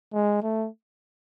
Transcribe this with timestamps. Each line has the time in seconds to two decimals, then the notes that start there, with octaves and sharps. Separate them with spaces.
0.13 G#3
0.42 A3